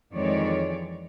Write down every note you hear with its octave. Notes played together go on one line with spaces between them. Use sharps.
F2 D#3 E3 G#3 C#5 D5